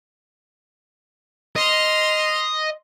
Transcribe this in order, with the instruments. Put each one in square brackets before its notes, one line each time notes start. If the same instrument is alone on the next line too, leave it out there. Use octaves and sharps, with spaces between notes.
[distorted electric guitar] D#5 [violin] C6 F6